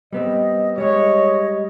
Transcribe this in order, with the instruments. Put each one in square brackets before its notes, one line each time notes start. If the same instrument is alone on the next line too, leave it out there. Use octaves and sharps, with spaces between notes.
[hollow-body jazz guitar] G3 B3 C4 [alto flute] D#5
[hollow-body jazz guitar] G3 G#3 [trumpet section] C#5 [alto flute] D#5